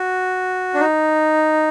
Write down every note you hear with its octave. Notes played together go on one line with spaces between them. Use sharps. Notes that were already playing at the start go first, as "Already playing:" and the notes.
Already playing: F#4
D4
D#4